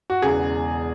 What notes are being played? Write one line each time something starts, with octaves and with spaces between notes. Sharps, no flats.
F#4
E1 E2 C#3 G#4